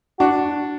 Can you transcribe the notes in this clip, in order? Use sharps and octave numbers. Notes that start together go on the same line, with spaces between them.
D4 F#4